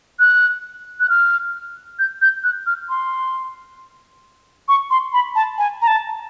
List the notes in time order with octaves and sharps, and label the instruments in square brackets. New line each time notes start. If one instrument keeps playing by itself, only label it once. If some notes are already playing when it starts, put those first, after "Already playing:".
[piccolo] F#6
F#6
F6
G6
G6
F#6
F6
C6
C#6
C6
B5
A5
G#5
A#5
A5